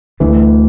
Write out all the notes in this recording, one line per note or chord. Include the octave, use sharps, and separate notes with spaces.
D2 D3 E3 A3 D4